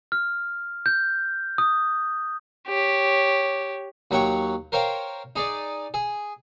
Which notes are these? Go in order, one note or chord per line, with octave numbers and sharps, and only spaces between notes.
F6
G6
D#6
G4 C#5
D#2 F#3 C#5 F#5 G5 C#6
A#4 C5 C#5 F5 G5
D#4 G#4 D5
G#4